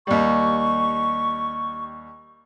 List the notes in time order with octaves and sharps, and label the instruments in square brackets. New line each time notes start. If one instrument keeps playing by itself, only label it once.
[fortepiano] D#2 G3 [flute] C#6